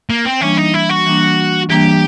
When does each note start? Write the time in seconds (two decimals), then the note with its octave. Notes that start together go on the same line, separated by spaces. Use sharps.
0.10 A#3
0.25 C4
0.41 E3 G3 A#3 C#4 D4
0.57 D#4
0.74 E4
0.90 F#4
1.06 E3 G3 A#3 D4
1.70 E3 G3 A#3 D4 G4